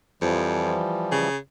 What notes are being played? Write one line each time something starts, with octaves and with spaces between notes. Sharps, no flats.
F2 E3 F3 G3
C#3